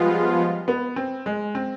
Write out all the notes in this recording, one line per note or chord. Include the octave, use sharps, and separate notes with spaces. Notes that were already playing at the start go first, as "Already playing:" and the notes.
Already playing: F3 G3 G#3 B3 F4
B3
C4
G#3
C4